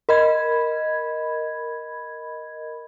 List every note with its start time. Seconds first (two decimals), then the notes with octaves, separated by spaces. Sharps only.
0.09 A#4 D#5 B5 G#6